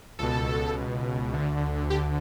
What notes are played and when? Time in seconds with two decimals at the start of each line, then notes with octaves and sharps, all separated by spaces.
0.19 C#2 B2 A4
1.33 D2 D3
1.90 G4